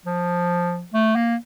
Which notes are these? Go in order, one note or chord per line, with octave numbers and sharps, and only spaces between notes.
F3
A3
A#3